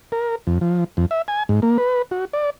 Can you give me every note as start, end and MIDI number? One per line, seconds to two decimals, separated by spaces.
0.12 0.35 70
0.47 0.59 41
0.61 0.84 53
0.97 1.06 41
1.11 1.22 76
1.28 1.43 80
1.49 1.60 44
1.62 1.78 58
1.78 2.02 71
2.11 2.25 66
2.33 2.50 74